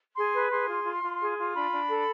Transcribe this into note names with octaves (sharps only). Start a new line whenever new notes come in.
G#4 C6
B4
G#4 C6
F4
F4
F4
G#4
F4
D4 B5
D4
A4